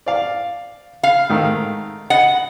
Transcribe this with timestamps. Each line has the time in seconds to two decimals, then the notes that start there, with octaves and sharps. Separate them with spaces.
0.06 D5 F5
1.03 F5
1.29 G#2 D#3 A3
2.10 D#5 F#5